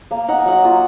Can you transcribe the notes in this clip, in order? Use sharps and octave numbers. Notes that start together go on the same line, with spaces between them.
A#3 F5
D#4 F#5
G#5
F#3 F#5
A#3 F4